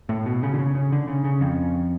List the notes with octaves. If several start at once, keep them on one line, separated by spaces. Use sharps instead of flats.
A2
B2
C#3
D3
C#3
C#3
D3
C#3
C#3
F2